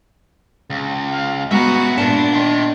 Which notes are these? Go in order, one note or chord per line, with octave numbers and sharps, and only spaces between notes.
C#2
F5
G#3 B3 F#4 E5 A#5
A#2 D4 A#4 A5
D#3 E5 C6